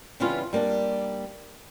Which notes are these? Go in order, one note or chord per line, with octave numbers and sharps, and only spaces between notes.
C#3 E3 G3 B3 C#4 F4
G3 A#3 C#4 D4